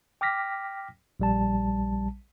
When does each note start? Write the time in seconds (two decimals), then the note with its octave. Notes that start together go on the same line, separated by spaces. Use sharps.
0.21 G5 D6 F6 A#6 B6
1.20 A#1 G3 A5